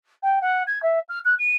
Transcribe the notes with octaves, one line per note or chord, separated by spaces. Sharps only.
G5
F#5
G#6
E5
F6
F#6
D#7